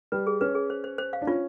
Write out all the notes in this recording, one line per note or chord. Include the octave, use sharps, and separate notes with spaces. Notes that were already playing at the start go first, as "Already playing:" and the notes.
G3 B4
G#4
C#4 B4
G#4
C5
C5
C5
F5
D4
C#4 F4